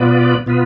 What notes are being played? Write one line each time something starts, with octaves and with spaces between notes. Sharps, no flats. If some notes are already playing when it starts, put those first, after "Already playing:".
Already playing: B2 B3 F4 B4 D5
B2 B3 F4 B4